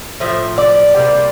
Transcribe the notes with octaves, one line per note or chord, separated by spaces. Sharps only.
A2 F3 E5
D5
C3 G3 A#3